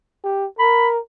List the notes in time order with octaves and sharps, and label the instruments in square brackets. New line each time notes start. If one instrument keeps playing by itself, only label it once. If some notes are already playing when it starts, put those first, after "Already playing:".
[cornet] G4
[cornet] A#4 [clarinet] B5